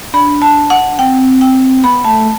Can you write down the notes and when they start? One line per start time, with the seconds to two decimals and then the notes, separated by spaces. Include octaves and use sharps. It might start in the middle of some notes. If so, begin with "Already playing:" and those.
0.13 D4 B5
0.42 A5
0.70 F#5
0.99 C4 G5
1.41 G5
1.84 B3 B5
2.05 A3 A5